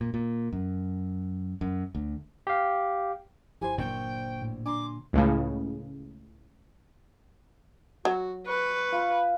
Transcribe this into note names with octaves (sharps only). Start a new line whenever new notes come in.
A#2
A#2
F#2
F#2
D2
G4 F5
G1 F3 E4 G4 C5 G#5
A#2 D3 F#3 G5 C#6
A2
D4 G#5 A#5 C6 D6
C#2 A2 C#3
F#3 F#4
B4 C#6
F4